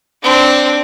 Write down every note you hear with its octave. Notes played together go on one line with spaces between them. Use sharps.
C4 D4